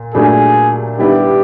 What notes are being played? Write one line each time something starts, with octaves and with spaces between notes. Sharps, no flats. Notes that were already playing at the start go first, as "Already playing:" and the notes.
Already playing: A#2
A#2 F#3 A3 D4 G#4
G2 D#3 G3 B3 E4 G4